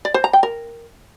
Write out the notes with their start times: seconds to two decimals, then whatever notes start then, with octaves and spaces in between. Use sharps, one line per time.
0.05 D5
0.14 C5
0.24 A#5
0.33 G5
0.43 A#4